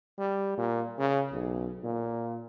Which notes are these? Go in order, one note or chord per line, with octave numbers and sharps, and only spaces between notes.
G3
A#2
C#3
B1
A#2